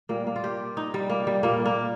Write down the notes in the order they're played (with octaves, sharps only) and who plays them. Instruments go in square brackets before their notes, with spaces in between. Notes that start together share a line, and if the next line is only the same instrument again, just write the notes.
[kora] A#2 G3 A#3
A#3
F4
G4
D#4
G3
A#3
G3
A#2 G3 A#3
A#3